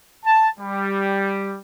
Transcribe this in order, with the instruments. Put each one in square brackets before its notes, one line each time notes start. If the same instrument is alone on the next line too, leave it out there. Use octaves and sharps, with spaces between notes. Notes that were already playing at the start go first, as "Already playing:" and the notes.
[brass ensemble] A5
G3